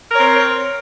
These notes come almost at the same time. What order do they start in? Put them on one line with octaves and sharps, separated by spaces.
A#4 C#5 C4